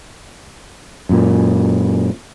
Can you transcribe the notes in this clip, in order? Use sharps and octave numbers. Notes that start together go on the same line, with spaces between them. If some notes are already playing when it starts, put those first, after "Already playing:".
F#2 A#2